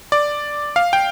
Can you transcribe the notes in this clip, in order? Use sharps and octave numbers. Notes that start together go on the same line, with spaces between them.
D5
F5
G5